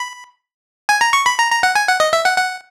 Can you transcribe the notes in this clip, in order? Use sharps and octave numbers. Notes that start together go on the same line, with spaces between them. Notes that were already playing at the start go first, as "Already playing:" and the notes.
Already playing: B5
G#5
A#5
C#6
B5
A#5
A#5
F#5
G#5
F#5
D#5
E5
F#5
F#5